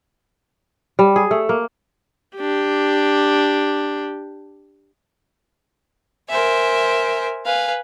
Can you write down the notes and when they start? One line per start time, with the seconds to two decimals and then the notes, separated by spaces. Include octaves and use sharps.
0.99 G3
1.16 G#4
1.31 A3
1.49 A#3
2.37 D4 G4
6.29 A#4 C5 E5 G#5
7.45 B4 F5 G#5